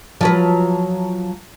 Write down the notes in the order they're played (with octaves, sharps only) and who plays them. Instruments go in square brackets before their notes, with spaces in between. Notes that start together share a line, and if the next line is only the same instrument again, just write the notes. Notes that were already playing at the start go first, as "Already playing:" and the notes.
[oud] F3 F#3 B4